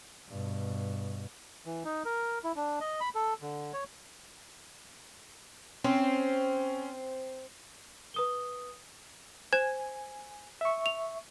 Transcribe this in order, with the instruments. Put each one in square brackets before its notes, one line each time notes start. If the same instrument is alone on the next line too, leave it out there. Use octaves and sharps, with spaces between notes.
[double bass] G2 B2
[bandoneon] E3
D#4
A#4
E4
D4
D#5
B5
A4
D3
C#5
[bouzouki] C4 [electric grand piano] C#4
[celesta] B4 D#6 G7
[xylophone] C5 G#6 E7 [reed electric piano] G#5
[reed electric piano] E5 C#6
[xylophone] F7